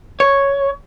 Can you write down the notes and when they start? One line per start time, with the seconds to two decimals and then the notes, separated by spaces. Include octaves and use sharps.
0.20 C#5